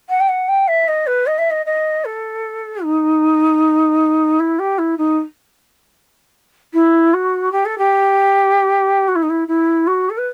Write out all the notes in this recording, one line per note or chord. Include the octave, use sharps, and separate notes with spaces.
F#5
G5
F#5
G5
E5
D#5
B4
D#5
E5
D#5
D#5
A4
D#4
E4
G4
E4
D#4
E4
F#4
G4
A4
G4
F#4
E4
D#4
E4
E4
F#4
A4
B4